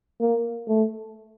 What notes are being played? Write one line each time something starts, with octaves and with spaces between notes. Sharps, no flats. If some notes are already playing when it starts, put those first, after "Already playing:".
A#3
A3